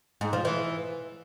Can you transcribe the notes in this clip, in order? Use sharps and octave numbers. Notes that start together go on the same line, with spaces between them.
G#2
F3
E3